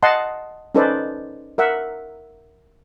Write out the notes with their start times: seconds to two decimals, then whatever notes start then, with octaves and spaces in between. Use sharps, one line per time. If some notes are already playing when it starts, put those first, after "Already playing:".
0.03 D#5 F#5 A5 C6
0.75 C#4 D#4 A4 B4 C5 D5
1.58 A#4 E5 F#5